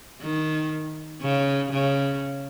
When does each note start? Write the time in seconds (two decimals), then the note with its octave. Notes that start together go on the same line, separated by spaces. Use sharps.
0.21 D#3
1.22 C#3
1.72 C#3